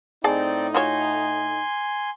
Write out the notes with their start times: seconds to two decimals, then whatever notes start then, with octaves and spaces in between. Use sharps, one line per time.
0.24 A2 C4 D#4 G#4 D5 A5
0.75 F4 F#4 C#5 G#5 C6